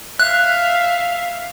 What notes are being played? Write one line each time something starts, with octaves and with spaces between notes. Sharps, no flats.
E5 F5 F#6